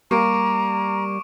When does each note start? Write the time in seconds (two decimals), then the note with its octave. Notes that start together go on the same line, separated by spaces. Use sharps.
0.11 G3 A#3 A#5 C#6 D6 D7